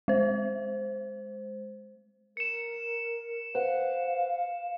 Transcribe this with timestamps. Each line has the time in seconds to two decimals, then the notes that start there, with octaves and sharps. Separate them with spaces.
0.08 G#3 C5
2.37 A#4 C#7 E7
3.55 B4 C5 F5 F#5